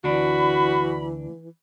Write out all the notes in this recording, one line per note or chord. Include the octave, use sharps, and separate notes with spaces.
D2 E3 D4 F#4 B5